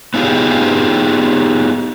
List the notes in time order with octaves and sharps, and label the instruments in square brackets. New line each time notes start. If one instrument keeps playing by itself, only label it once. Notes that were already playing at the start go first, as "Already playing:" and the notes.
[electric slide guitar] B3 D#4 F4 G4 G#4